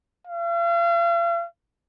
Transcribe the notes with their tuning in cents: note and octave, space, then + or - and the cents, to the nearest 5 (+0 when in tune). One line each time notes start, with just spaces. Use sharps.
F5 -40